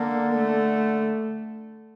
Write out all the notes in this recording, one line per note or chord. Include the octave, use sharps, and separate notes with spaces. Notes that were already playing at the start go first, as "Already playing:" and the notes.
Already playing: D3 A#3
A3